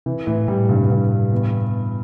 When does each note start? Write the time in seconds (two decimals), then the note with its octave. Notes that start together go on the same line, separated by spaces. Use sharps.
0.06 C3 E3
0.27 A2 E3
0.48 A2 G3
0.69 G2 C3
0.90 G2
1.11 G3
1.32 E2